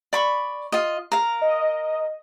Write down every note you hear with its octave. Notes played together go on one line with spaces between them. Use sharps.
D5 B5 C#6
F4 D#5
A#4 F5
D#5